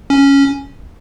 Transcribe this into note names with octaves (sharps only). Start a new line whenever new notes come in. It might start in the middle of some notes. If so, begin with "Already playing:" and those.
C#4